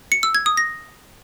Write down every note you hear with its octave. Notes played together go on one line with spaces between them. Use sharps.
C#7
E6
G#6
D#6
A#6